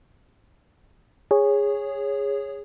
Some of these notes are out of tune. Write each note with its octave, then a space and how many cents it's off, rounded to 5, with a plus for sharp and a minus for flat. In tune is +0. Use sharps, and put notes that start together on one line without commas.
G#4 -15 C#5 +0